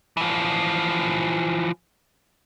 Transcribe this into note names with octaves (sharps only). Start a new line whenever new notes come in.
E3 F3